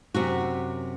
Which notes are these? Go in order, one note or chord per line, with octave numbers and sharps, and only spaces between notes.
F#2 C3 F#4